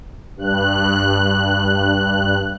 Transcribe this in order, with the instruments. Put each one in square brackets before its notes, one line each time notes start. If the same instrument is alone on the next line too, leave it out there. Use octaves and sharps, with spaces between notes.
[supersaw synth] G2 F#6